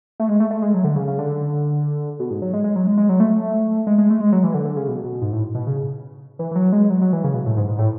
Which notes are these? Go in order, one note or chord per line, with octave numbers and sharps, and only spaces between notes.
A3
G#3
A3
A3
G#3
F#3
D3
C#3
C#3
D3
B2
G#2
F#3
G#3
G#3
F#3
G#3
G#3
F#3
A3
G#3
G#3
A3
G#3
F#3
E3
D3
D3
C#3
B2
B2
G#2
A2
B2
C#3
E3
E3
F#3
G#3
F#3
F#3
E3
C#3
B2
A2
G#2
G#2
A2